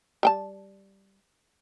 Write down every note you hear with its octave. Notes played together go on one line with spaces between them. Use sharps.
G3 G5 A5